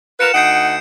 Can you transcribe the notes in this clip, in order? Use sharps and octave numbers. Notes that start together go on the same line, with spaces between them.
F4 A#4 B4 C#7 E7
D2 D#4 F#5 G6 C7 D7